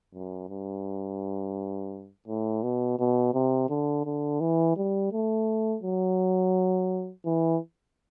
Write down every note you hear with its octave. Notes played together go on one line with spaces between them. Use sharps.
F#2
G2
A2
B2
B2
C3
D3
D3
E3
G3
A3
F#3
E3